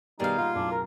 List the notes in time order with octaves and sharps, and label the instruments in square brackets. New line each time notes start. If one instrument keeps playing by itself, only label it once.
[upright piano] B2 D#3 B3 [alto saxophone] G3 [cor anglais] D#4 [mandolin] G#4 F5
[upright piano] A#2 G3 F#5 [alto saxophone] F4
[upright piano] B1 F#2 A2 [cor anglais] D4
[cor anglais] A#4